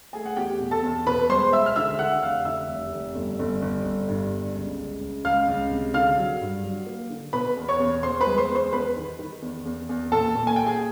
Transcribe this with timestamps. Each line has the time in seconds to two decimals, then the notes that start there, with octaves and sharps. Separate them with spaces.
0.13 A3 G#4 G#5
0.26 F#5
0.37 E2 G4 G5
0.60 B2
0.71 A4 A5
0.83 E2
1.07 B2 B4 B5
1.29 G#3 C5 C6
1.53 G#3 E5 E6
1.66 F6
1.76 D3 E5 E6
1.99 D3 F#5 F#6
2.22 F1 F5 F6
2.45 D3 E5 E6
2.69 F1
2.92 F1
3.15 G1
3.39 G1
3.62 G1
3.85 G1
4.08 G2
4.32 G1
4.55 C#2
4.78 C#2
5.01 C#2
5.25 C#2 F5 F6
5.48 C#2
5.71 C3
5.94 D3 F5 F6
6.17 F#3
6.41 G2
6.64 F#3
6.87 A#3
7.10 D3
7.33 B2 B4 B5
7.57 E2
7.69 C#5 C#6
7.80 E2
8.03 E2 C5 C6
8.21 B4 B5
8.26 G#3
8.38 C5 C6
8.49 E2
8.55 C5 C6
8.72 E2 B4 B5
8.96 D#3
9.19 D#3
9.42 E2
9.65 E2
9.89 E2
10.12 A#2 A4 A5
10.35 A#2
10.47 G#5
10.56 A#2 G5
10.66 G#4 G#5